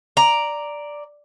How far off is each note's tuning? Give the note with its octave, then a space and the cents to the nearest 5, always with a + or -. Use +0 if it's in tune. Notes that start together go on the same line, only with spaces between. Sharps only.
D5 +0 A#5 +0